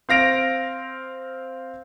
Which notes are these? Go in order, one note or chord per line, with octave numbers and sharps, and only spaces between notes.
C4 F5 A#6 D7 F7